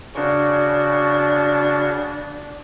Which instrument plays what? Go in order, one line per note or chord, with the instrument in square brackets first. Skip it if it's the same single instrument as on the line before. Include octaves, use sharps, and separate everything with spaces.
[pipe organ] C#3 F#4 [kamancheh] D4